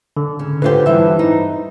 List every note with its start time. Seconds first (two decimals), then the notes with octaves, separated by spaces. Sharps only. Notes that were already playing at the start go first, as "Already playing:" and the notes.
0.17 D3
0.39 C#3
0.62 D3 F4 G4 B4 C5
0.86 G2 E3 E5
1.19 D#4